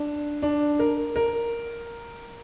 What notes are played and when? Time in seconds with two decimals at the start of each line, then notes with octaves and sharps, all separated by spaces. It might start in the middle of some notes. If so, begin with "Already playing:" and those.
Already playing: D4
0.42 D4
0.79 A#4
1.16 A#4